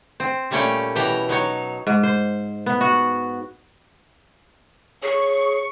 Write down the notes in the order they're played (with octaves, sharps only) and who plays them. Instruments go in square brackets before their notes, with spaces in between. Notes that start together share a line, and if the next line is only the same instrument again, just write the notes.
[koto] C4
A#2 G3 A3 C#4 C#5 G5
B2 E3 G4 C#5 G5 A#5
F#3 D#4 C#5
[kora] G#2
C5
B3
F#4
[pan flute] G#4 [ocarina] C#5 [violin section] C#6